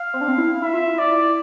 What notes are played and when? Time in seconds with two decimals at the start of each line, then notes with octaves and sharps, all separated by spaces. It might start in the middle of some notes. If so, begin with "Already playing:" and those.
Already playing: F5
0.14 C4
0.21 D4
0.28 C4
0.38 E4
0.62 E4 E5
0.74 F4
0.87 E4
0.99 D5